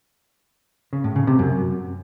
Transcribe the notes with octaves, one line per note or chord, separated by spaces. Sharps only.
C#3
A2
C#3
C3
F#2